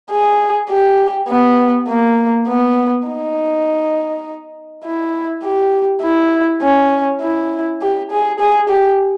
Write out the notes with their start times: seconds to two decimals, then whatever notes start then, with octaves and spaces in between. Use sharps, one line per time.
0.11 G#4
0.69 G4
1.28 B3
1.88 A#3
2.48 B3
3.07 D#4
4.84 E4
5.43 G4
6.02 E4
6.62 C#4
7.21 E4
7.81 G4
8.11 G#4
8.39 G#4
8.69 G4